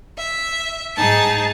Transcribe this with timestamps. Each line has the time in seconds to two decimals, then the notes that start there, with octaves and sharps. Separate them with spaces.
0.18 E5
0.96 G#2 D#4 G#4 A5